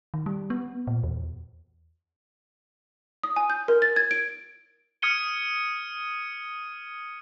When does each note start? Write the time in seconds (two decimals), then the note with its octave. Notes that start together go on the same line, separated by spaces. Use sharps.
0.14 D#3
0.26 G3
0.50 B3
0.87 A#2
1.03 E2
3.23 D#6
3.36 G#5
3.50 G6
3.68 A#4
3.82 A6
3.96 G#6
4.11 D7
5.02 D#6 F6 G#6 C#7 D#7 G7